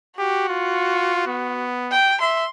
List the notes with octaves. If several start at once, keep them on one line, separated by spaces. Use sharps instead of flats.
F#4 G4
F4
B3
G5
E5 C6